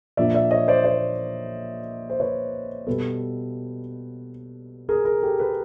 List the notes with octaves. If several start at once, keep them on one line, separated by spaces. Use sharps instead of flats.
A#2 F3 A#3 D4 D5 E5
D5 E5
C#5 D#5
C5 D5
C5 D5
C5
B4 C#5
B2 G3 B3 A4 B4
G#4 A#4
G#4 A#4
G4 A4
A4 B4